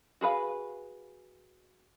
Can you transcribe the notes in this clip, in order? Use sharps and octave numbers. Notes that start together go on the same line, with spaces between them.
F#4 G#4 B4 F5